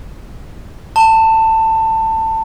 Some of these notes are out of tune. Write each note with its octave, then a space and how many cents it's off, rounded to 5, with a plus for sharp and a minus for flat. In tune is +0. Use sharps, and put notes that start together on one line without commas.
A5 +20